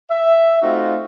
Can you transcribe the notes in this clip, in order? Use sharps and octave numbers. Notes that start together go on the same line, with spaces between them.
E5
A3 C4 D#4 F4 F#4